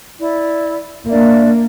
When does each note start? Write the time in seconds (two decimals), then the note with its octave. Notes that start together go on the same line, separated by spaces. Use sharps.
0.19 E4 D5
1.09 A#3 D4 D5 E5